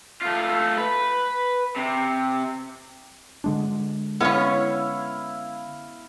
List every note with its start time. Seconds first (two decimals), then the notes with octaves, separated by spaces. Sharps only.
0.22 A3 F4
0.78 B4
1.76 C3
3.44 D3 G#3 D4
4.20 B3 C#4 E4 F5